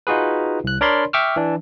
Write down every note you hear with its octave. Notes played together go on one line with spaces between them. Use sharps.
D#4 F4 F#4 G#4 B4
C2 F#6
D4 A#4 C#5 D5 B5 C6
E5 G5 C#6 D6 E6 F6
E3 D4